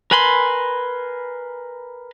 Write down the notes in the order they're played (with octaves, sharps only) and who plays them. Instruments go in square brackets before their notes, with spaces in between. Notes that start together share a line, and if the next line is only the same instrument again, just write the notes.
[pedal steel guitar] A#4 B4 G#5 B5 C6